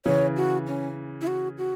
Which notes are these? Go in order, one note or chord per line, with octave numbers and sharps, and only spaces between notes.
C#3 E3 C#5
F#4
C#4
E4
F#4
F#4